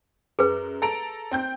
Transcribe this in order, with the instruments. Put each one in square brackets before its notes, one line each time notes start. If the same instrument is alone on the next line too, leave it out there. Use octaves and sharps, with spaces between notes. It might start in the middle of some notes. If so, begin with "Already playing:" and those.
[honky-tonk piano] F#2 [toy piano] G#4 B4
[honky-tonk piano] A4 A#5 D7
C4 G5 G6